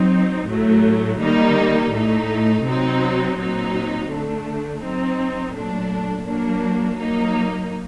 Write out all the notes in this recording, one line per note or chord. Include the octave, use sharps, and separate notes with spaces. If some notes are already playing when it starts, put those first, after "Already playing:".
Already playing: F#3 C4 D#4
A2 F#3 A3
D#3 G3 A#3 D#4
A2 A3 D#4
C3 F#3 C4 D#4
A#2 F#3 C4 D#4
D3 A3 D4
F#3 C4 D#4
A#2 F#3 A3 D4
F#3 A#3 D4
F#3 A#3 D#4